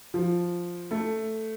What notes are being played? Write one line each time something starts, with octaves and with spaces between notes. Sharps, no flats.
F3
A3